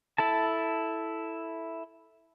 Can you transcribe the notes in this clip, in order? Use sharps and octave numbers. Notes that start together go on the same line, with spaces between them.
E4 A4 A5